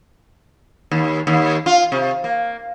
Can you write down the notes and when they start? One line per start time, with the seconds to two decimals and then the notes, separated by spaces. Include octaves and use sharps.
0.91 D#2
1.27 D#2
1.66 F4
1.92 C3
2.24 A#3